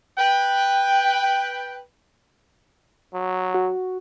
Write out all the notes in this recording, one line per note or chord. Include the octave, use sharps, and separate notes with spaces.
B4 G5
F#3
F#4